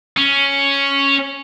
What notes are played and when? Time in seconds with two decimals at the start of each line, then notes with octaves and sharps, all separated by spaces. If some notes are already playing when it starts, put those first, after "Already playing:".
0.17 C#4